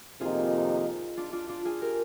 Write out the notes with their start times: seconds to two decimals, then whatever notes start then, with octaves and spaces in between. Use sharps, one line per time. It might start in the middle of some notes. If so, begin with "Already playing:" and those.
0.20 F2 C3 D#3 A#3 D#4 F4 G#4
1.17 D4 F4
1.32 D4 F4
1.49 D4 F4
1.65 F4 G#4
1.81 G4 A#4